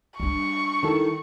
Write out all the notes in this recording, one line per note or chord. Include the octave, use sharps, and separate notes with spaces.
G3 D4 C#6
D#3 E4 A4